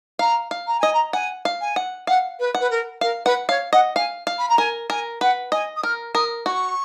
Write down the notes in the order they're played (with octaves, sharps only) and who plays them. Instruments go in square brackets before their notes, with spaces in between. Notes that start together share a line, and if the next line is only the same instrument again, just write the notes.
[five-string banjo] F5 [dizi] A#5
[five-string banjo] F5
[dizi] A#5
[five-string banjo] D#5 [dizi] G#5
[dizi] A#5
[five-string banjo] F#5 [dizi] G#5
[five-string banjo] F5
[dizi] G#5
[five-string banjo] F#5
[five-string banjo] F5 [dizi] F#5
[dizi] B4
[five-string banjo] F#5
[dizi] B4
A#4
[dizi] A#4 [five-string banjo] F5
[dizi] B4 [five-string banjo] F#5
[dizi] C#5 [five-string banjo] F5
[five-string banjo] D#5 [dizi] F#5
[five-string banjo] F5 [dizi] G#5
[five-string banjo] F5
[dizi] B5
A#5
[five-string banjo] A#4 [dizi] G#5
[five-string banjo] A#4 [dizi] G#5
[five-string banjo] B4 [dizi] F#5
[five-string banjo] D#5 [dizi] G#5
[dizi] D#6
[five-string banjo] A#4 [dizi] F6
[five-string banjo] A#4 [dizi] D#6
[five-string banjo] F#4 [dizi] C#6